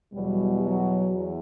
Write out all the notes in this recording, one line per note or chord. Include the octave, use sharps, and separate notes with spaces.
E2 B2 F#3 G3
F#3
E2